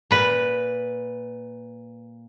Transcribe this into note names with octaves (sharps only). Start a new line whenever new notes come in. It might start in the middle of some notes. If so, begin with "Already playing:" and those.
A#2 B4